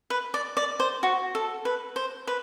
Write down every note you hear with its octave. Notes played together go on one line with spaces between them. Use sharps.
B4
D5
D5
C5
F#4
A4
B4
C5
B4